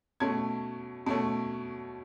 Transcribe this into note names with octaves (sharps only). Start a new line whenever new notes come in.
B2 A3 C#4 G#6
B2 A3 C#4